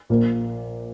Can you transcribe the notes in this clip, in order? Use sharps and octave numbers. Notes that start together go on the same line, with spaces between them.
A#1 A#2 A#3